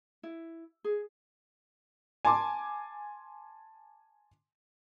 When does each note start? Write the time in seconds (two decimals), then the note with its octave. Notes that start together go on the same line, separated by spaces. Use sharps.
0.23 E4
0.84 G#4
2.25 G#5 A5 C6 D6